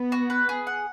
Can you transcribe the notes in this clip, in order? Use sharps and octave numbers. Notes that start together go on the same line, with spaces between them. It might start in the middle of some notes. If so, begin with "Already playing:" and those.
Already playing: B3
F#4
B4
G#4
F#5